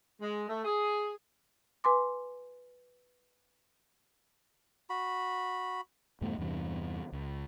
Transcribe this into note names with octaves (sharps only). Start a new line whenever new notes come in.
G#3
A3
G#4
B4 G#5 C6 D6
F#4 B5
E2 G2 B2 A3
E2 G2 C3 E3
C#2